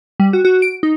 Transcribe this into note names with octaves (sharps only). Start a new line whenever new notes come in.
G3
F#4
F#4
D7
D#4